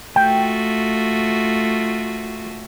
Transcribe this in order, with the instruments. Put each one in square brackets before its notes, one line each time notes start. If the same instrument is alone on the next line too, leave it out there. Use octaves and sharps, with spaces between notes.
[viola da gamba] A3 F4 F#4 [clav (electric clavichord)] G5